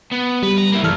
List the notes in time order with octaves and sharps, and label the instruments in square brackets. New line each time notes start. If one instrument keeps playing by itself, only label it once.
[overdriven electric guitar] B3
[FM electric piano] G3 [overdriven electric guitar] B4
[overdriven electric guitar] A#5
A#3 E4
[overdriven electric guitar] G2 [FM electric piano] E3 A4 F6